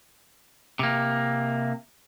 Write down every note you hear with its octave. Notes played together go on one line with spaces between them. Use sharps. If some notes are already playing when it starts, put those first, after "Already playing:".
C3 A#3